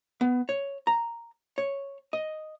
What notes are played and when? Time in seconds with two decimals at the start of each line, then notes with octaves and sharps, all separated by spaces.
0.21 B3
0.49 C#5
0.87 A#5
1.58 C#5
2.13 D#5